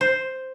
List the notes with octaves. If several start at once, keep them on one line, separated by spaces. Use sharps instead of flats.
C5